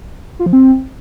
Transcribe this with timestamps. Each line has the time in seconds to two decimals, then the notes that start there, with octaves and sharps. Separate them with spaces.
0.39 F4
0.46 F3
0.53 C4